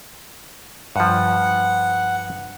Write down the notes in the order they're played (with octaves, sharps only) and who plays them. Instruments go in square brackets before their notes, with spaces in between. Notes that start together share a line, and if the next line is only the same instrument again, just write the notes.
[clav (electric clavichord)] G2 F3 [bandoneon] F#5